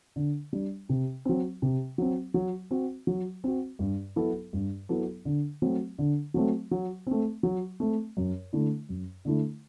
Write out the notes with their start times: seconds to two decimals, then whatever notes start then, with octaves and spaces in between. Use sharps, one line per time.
0.16 D3
0.53 G3 D4
0.89 C3
1.25 F#3 C4
1.62 C3
1.98 F#3 C4
2.34 F#3
2.71 C4 F#4
3.07 F#3
3.44 C4 F#4
3.79 G2
4.16 F#3 B3 E4 A4
4.53 G2
4.89 F#3 B3 E4 A4
5.25 D3
5.62 F#3 A3 C4
5.98 D3
6.34 F#3 A3 C4
6.71 F#3
7.07 A3 C4
7.43 F#3
7.80 A3 C4
8.17 F#2
8.53 D3 A3 E4
8.89 F#2
9.25 D3 A3 E4